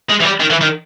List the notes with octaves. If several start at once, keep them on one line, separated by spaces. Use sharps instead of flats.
G#3
E3
G3
D#3
E3
D#3